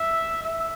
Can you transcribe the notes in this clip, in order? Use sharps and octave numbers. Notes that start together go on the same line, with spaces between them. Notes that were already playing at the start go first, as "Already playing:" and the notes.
Already playing: E5
E5